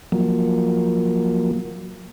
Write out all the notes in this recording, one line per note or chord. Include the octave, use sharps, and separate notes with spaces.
F3 F#3 A#3